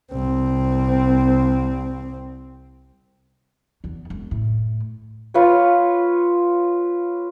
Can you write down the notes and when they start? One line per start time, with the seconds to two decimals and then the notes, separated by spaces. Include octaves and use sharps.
0.13 C2 C4
3.84 E2
4.10 E1
4.31 A2
5.34 F4 B4 C#5